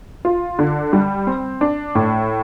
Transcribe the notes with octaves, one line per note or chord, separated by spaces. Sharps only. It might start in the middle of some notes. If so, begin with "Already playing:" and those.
F4
D3
G3
C4
D4
A2